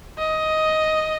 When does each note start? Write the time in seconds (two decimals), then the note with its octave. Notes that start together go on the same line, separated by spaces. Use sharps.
0.18 D#5